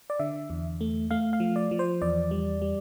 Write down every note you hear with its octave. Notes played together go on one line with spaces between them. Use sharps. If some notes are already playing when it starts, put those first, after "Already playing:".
D5
D3 E5
E2
A3
A3 F5
F5
F3
D5
F3
C5
E2 D5
G3
G3